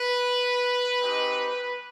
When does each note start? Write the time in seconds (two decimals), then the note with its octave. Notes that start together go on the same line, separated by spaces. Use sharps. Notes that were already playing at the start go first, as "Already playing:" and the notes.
Already playing: B4
1.00 G#3 C4 D#4 G4